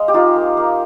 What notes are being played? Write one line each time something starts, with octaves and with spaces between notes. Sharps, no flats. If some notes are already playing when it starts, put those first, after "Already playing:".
Already playing: G#3 D#5 F5
G4
D#4 F4
A#3
A#3